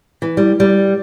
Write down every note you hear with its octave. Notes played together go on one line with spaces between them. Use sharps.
E3
G3
G3